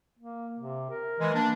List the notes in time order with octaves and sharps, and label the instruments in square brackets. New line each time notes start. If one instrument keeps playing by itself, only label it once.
[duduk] A#3
C3
A#4
[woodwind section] E3 G#3
A#3 D4